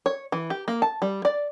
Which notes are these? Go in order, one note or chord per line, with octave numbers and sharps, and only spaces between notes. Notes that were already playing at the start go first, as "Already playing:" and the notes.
C#5
E3
G4
A#3
A5
G3
D5